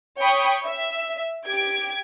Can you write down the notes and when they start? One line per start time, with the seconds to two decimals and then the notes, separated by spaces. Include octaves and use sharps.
0.19 C#5 G5 B5 C#6 D#6
0.65 E5
1.46 G4 G#6 D7